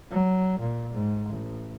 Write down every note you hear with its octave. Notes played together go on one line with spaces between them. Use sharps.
F#3
A#2
G#2
A1